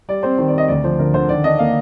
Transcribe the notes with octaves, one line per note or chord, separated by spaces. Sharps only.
G3 D5
C4 C5
D#3 C5
D5
C4 D#5
D2 D5
F3 C5
D3 A#4
D3 C5
D#3 D5
D4 D#5
A#3 F5